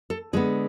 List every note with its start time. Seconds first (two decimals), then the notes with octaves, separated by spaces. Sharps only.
0.10 A4
0.33 D3 G#3 B3 G#4